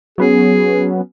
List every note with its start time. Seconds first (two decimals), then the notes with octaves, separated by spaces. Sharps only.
0.18 F#3 B3 C#4 G#4